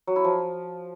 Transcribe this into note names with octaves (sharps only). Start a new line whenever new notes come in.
F#3
E4
F3